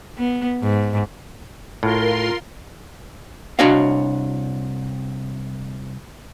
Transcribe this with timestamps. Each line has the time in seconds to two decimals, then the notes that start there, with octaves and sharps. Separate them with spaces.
0.18 B3
0.62 G#2
1.83 A2 F4 A#4 C6
3.59 C2 D4 F#4 C#5 D#5 F5